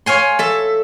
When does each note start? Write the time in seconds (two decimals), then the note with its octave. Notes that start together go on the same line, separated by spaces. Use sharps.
0.06 C#5 F5 G#5 C6
0.39 A4 E5